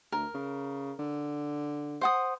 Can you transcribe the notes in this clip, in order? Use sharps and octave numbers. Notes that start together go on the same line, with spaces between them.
D2 A#4
C#3
D3
C5 F#5 D#6